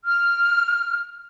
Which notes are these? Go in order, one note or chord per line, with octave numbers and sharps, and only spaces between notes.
F6